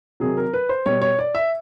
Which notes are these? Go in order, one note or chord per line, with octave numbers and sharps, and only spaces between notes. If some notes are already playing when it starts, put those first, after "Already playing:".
C3 D#3 F#3 G#4
A#4
B4
C5
B2 G3 C#5
C#5
D5
E5